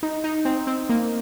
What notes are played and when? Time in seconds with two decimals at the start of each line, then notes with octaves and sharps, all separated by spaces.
0.03 D#4
0.24 D#4
0.45 C4
0.67 C4
0.89 A#3